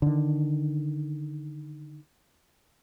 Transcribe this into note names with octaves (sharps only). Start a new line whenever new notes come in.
D3 D#3